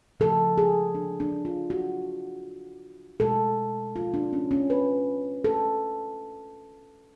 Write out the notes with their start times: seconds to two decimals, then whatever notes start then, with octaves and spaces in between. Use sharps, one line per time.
0.20 C#3 F3 A3 A4
0.58 G#4
0.95 D4
1.20 D4
1.45 F4
1.70 F#4
3.20 B2 G#3 A4
3.96 F4
4.14 D4
4.33 C#4
4.51 C#4
4.70 B4
5.44 A4